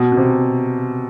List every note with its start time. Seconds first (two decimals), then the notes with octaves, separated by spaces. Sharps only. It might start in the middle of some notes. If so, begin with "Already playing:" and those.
Already playing: B2
0.12 B2
0.17 C3